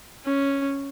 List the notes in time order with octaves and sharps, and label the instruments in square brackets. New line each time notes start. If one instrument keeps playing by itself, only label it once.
[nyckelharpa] C#4